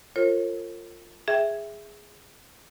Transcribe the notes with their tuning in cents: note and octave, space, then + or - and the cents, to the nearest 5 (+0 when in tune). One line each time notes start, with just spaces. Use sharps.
F4 +0 A#4 -40 C#5 -45
G#4 -5 E5 +0 G5 +0